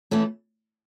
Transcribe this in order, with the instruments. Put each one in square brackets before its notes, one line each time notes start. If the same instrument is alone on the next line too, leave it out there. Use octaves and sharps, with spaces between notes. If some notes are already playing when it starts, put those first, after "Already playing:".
[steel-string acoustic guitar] E3 A3 C#4